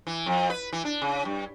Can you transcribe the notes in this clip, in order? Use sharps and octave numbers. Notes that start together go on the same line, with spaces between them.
E3
F2
B4
E3
D4
C#3
G2